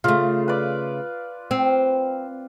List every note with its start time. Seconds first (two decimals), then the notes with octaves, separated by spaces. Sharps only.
0.04 C#3 A3 F4
0.48 B4 D5
1.51 C4